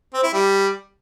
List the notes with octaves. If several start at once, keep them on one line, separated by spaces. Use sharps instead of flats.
C4
E4
G3